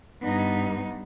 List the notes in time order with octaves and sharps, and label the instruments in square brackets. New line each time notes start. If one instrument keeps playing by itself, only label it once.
[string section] G2 [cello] B3 D#4